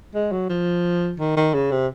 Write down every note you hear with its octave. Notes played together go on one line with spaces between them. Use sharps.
G#3
F#3
F3
D#3
D#3
C#3
C3